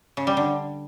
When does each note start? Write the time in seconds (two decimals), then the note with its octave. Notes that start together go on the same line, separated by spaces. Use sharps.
0.17 C#3
0.27 G3
0.37 D3